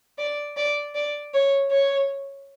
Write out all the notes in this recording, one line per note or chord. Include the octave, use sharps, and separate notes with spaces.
D5
D5
D5
C#5
C#5